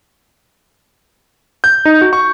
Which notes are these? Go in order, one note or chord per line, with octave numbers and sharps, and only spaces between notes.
G6
D#4
F#4
C#6